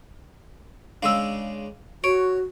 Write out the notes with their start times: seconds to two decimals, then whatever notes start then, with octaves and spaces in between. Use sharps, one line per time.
1.03 C#3 G#3 D4 F5 E6
2.04 F#4 C#5 D7